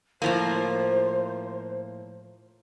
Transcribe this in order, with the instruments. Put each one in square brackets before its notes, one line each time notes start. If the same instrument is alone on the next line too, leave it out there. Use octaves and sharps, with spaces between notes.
[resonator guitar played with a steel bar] A2 F3 A#3 [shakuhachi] C5